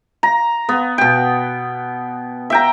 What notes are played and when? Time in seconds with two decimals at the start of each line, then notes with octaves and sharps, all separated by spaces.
0.23 A#5
0.69 B3
0.98 B2 G5
2.50 E5 G5 A#5